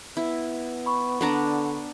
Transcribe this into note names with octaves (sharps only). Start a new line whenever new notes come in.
B3 E4
B5 C#6
D3 B3 D4 A#5